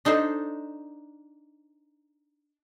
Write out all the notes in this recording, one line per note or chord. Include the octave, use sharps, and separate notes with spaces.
D4 D#4 A4 C5